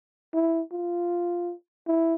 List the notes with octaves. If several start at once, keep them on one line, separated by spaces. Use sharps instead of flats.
E4
F4
E4